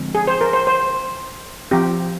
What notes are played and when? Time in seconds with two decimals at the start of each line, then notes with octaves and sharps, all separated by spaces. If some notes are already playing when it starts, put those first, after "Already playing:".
Already playing: D3 F3 G#3 C4
0.15 G#4
0.27 C5
0.41 A#4
0.53 C5
0.67 C5
1.71 F3 C4 G4